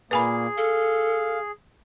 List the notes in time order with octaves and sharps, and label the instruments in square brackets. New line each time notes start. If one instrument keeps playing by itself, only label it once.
[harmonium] A#2 A#3 [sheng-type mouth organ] G#4 [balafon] B4 G#5 B5
[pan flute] A4 [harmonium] F5